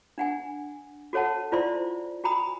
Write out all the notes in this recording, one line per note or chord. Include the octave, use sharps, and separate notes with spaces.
D4 F#5 G#5
F#4 A4 C#5 F#5 A5
E4 F4 C5 D5 E5 C6
F#4 G5 G#5 A#5 B5 D#6